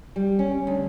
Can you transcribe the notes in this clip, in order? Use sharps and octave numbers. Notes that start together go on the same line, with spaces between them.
G3
C#4
D2